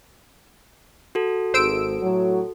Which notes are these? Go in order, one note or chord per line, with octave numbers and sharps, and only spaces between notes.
F#4 A4
G#1 C5 E6 D7
A2 F#3